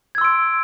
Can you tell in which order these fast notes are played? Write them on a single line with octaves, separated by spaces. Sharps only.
G#6 E6 C6 D7